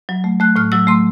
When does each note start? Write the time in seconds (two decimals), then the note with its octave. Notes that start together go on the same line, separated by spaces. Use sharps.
0.09 F#3
0.24 A3
0.40 A3 F#6
0.56 A2 F6
0.72 F#3 E6
0.87 A3 C6